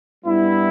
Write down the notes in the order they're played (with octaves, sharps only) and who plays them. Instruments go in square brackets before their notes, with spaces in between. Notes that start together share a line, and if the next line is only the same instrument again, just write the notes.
[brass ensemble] G2 G3 B3 E4